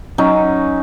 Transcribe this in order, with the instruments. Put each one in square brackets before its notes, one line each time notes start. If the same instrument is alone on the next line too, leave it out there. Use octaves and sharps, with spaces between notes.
[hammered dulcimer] F#3 C#4 D#4